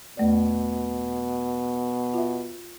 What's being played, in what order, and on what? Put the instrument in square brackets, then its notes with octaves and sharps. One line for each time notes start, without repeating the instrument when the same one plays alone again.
[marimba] E2 A3 D5 [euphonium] B2
[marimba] F4 E5